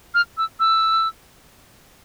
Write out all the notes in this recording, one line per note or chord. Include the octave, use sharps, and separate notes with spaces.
F6
E6
E6